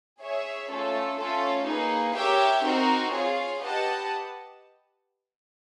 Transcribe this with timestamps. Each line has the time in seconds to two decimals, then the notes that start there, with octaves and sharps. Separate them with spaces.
0.22 G#4 C#5 E5
0.71 A3 C#4 F4 A4
1.19 A3 C#4 F4 A4
1.68 A#3 D#4 G#4 B4
2.16 G4 A#4 C#5 E5 G5
2.64 C4 D#4 F#4 A#4
3.12 F4 G#4 C#5 F5
3.61 G4 B4 D#5 F#5 A5